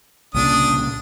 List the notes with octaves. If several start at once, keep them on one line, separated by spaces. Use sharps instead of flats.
C2 A#2 C#3 D4 D#6